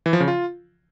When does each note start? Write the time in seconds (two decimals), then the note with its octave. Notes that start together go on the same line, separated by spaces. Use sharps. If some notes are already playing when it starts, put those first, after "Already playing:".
0.06 E3
0.13 F3
0.20 C#3
0.28 F4